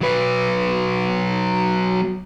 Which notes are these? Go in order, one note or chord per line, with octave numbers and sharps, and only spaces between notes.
F#3 B4